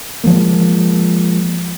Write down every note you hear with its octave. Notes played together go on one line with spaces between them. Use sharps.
F3 F#3 G#3 A#3